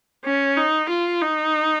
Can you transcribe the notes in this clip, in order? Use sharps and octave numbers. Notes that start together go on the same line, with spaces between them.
C#4
D#4
F4
D#4